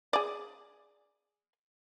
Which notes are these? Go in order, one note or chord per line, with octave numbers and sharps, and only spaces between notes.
G#4 D5